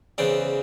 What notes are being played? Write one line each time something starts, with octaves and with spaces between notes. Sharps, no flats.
E2 C#3 E3 C5 D5